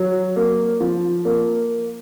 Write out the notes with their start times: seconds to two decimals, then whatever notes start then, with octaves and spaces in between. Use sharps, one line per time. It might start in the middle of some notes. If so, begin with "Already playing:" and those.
Already playing: F#3
0.36 A#3
0.80 F3
1.25 A#3